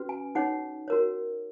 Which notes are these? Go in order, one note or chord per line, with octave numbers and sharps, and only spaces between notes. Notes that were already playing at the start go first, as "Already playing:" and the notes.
Already playing: C#4 F#4 B4
G#5
D#4 G#4 C#5 F#5
F#4 A#4 C#5